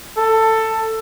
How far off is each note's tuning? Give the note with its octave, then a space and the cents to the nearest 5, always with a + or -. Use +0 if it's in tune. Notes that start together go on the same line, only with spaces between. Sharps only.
A4 +15